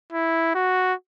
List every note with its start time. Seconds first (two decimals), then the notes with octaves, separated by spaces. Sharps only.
0.12 E4
0.55 F#4